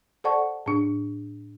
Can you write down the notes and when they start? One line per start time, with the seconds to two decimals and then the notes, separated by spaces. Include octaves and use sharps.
0.24 A4 C5 D5 F#5 A5 C#6
0.66 A2 D4